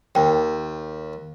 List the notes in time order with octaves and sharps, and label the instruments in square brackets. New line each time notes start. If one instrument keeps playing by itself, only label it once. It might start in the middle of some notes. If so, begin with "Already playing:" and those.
[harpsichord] D#2 [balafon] G5